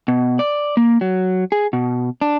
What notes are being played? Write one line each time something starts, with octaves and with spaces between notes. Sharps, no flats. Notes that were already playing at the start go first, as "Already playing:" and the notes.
B2
D5
A#3
F#3
G#4
B2
D4